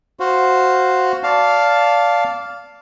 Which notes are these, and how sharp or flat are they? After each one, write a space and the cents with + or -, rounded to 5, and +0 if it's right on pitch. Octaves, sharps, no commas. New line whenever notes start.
F#4 +0 C5 +0 F5 +0
D5 -20 F5 +0 A5 +0